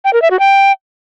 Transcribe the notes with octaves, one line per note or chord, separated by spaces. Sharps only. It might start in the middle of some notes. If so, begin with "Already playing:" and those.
G5
A#4
E5
F#4
G5